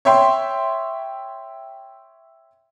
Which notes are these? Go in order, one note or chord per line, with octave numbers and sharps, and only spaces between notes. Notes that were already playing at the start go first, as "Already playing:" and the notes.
C#5 E5 G5 C6